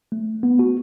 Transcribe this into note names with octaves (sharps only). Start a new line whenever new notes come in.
A3
B3
F#4